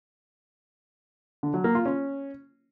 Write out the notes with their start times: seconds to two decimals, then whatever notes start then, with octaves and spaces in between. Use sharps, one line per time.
1.43 D3
1.54 F#3
1.64 A#3
1.75 F4
1.86 C#4